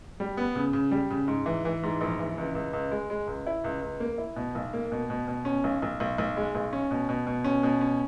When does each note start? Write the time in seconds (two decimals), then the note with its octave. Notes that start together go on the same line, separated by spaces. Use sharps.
0.20 G3
0.37 B3
0.55 C#3
0.73 C#3
0.91 G3
1.10 C#3
1.28 G#2
1.46 E3
1.65 E3
1.83 G#2
2.01 A#1
2.19 E3
2.38 C#2
2.55 C#2
2.73 C#2
2.91 G#3
3.10 G#3
3.27 C#2
3.47 E4
3.64 C#2
3.82 C#2
4.00 A#3
4.18 E4
4.36 B2
4.55 B1
4.74 A#3
4.92 B2
5.10 B2
5.28 B2
5.45 C#4
5.64 B1
5.82 B1
6.00 B1
6.18 B1
6.37 G#3
6.55 B1
6.73 C#4
6.91 B2
7.09 B2
7.27 B2
7.44 C#4
7.63 B2
7.81 C#4